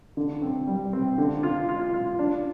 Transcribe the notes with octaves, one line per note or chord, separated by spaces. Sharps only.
D3
C4
G3
C4
D3
F4
F4
F4
D4